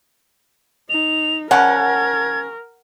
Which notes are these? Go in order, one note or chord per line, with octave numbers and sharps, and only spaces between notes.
D#4 F7
C#3 F3 C#4 A#4 F#5 G#6